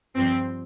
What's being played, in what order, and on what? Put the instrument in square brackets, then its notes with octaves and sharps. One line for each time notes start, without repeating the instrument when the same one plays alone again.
[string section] G2 F3 C4